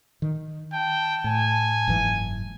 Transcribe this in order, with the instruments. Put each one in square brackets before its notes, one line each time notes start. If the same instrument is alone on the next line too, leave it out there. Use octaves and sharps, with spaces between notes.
[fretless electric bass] D#3
[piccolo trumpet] G5 [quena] A5
[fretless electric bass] A2 [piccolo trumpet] G#5
[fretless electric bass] F#1 G#2 E3